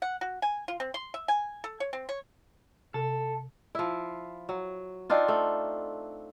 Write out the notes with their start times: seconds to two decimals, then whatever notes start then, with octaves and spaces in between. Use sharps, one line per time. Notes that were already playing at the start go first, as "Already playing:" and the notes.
0.02 F#5
0.21 F#4
0.42 G#5
0.68 F4
0.80 C4
0.94 C6
1.14 E5
1.28 G#5
1.64 A4
1.80 C#5
1.93 C4
2.09 C#5
2.94 C3 A4
3.75 F3 E4
4.49 F#3
5.10 C4 D4 D#4 F4
5.28 A3